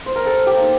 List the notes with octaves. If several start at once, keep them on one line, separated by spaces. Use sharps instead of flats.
C5
A#4
G3 A4
G4
A#3 D#4